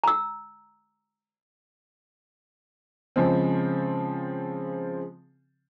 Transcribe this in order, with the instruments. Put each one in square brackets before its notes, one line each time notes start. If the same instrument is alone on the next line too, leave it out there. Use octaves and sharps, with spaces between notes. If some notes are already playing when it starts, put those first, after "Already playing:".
[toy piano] A#5 E6
[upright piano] C#3 F3 G#3 C4